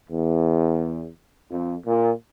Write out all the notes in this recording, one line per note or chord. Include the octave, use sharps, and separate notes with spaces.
E2
F2
A#2